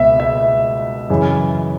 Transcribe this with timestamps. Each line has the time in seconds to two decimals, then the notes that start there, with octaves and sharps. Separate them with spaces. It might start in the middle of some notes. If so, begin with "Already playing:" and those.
Already playing: C#2 B2 B3 E5
0.20 E5
1.10 F#2 C#3 E3